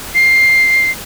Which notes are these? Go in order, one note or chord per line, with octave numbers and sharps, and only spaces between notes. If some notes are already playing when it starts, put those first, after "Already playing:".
C7